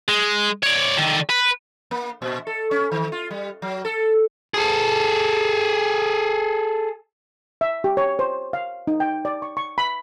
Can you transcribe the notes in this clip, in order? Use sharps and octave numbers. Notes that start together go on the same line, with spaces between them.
G#3
C#5 D5
D3 D#3
B4
A#3
A#2
A4
C#4
D#3
F4
G3
F#3
A4
G#4 A4
E5
G4
C#5
C5
F5
D#4
G5
D5
C#6
C#6
B5